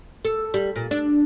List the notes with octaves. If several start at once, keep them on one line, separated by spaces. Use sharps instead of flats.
A4
G3
A#2
D4